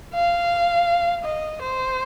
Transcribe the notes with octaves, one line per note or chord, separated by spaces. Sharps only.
F5
D#5
C5